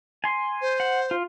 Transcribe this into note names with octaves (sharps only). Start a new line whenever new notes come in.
G#5 C6
C5
F#5
F4